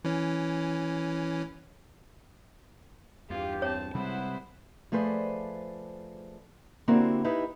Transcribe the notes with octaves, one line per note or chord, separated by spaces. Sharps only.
E3 C#4
E2 G2 F4 G4
C4 C#5 A5
C3 G3 G#3 B3 E4 C5 F#5 B5
F3 A3 G#4 B4 C5 D5
D3 A#3 C4 E4 F#4 G4
D#4 E4 G4 B4